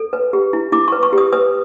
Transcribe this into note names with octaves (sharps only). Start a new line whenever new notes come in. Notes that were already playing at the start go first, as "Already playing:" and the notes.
Already playing: A4
B4
G4
E4
E4 D6
C#6
B4
C#6
G4
D#6
B4 D#6